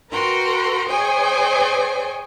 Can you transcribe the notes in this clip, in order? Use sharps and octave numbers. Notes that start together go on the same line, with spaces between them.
F#4 A#4 B4 G5 A#5 C6
G#4 C5 C#5 D#5 G5 G#5